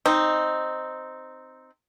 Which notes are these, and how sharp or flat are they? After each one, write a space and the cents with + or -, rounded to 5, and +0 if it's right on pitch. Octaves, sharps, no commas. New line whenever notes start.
C4 +0 D#4 +0